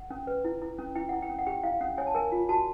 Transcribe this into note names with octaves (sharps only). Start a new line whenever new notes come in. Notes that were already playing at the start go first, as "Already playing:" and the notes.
Already playing: F#5
C#4
B4
E4
E4
C#4
E4 G5
E4 F#5
G5
C#4
F#5
G4 G5
E4 F5
C#4 F#5
C#5 G#5
A5
A#4 G#5
F4
F#4 A5